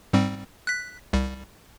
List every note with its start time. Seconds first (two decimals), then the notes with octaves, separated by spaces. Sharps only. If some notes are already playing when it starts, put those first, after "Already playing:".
0.13 G#2 G3 C4
0.67 F#6 B6
1.13 C2 G3